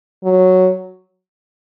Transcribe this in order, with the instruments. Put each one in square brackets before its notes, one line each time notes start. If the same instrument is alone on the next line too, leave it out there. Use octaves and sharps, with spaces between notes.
[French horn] F#3